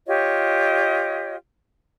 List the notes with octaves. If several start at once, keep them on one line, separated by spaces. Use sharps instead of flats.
F4 G4 C#5 D#5